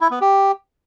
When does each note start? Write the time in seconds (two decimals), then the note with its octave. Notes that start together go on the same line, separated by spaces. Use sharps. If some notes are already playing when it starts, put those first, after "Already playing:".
0.01 E4
0.11 B3
0.21 G4